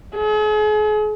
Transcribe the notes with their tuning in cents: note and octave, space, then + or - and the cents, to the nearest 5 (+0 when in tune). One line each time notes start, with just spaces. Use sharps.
G#4 +40